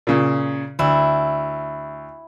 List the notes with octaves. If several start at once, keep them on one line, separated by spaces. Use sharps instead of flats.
A#2 C#3
D2 E4